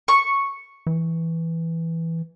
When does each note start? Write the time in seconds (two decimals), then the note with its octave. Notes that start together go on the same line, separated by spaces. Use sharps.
0.08 C#6
0.87 E3